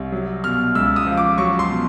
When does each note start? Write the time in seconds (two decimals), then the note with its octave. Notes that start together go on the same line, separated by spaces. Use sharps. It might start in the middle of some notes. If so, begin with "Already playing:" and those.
Already playing: C2
0.12 F#3
0.44 B2 F6
0.75 C#2 E6
0.96 D#6
1.07 F3
1.17 D6
1.38 F#3 C#6
1.59 C6
1.70 B2